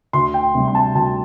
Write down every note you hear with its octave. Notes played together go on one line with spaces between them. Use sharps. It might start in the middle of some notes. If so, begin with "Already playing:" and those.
D2 C6
G5
C3 G3
C6
A5
D2 A5